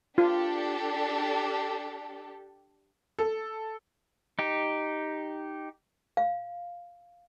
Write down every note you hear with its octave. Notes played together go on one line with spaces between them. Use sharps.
D4 F4 G4 A4
A4
D#4 G4
F5